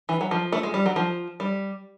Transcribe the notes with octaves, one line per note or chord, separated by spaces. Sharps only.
E3
F#3
F3
A3
G#3
G3
F#3
F3
G3